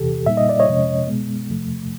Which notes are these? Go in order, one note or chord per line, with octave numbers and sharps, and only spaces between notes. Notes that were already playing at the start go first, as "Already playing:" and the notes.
Already playing: E2 C3 E3 G4 A4
A#2 G3 A#3 D#4 E5
D#5
D5
C#5 D#5
F2 C3 F3 G#3 C#4
B2 G#3 B3
E2 C3 F3 A3